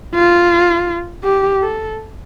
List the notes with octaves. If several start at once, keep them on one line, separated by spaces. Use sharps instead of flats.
F4
G4
A4